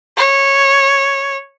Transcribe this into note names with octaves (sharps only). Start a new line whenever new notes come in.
C#5